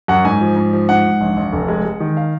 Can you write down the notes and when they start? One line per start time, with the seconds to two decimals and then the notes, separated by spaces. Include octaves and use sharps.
0.08 F#2 F#5
0.24 G#2 G#5
0.41 F3
0.56 G#2
0.73 F3
0.89 G#2 F#5
1.05 G#2
1.21 A#1
1.37 A#1
1.52 F1
1.68 G#3
1.85 G#3
2.00 D#3
2.17 F5